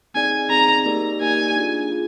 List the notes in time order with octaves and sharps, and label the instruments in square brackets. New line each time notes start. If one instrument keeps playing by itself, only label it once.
[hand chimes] C4 D#4 G#4 D5 [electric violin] G#5
[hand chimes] C4 D#4 G#4 D5 [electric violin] A#5
[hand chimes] A#3 D#4 G4 A#4 D5
[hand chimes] A#3 D#4 G4 A#4 D5 [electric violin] G#5
[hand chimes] D4 F4 G#4
F4 G#4